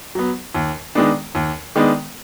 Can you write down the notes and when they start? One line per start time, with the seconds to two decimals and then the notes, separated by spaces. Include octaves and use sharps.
0.15 F#3 B3
0.55 D#2
0.95 D#3 G#3 B3 D4
1.35 D#2
1.76 D#3 G#3 B3 D4